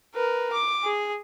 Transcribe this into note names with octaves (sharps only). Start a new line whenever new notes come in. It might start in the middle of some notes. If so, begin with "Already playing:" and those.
A#4 B4
D6
G#4